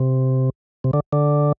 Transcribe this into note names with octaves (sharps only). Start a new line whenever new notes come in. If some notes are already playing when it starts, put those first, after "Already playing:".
Already playing: C3
C3
D3
D3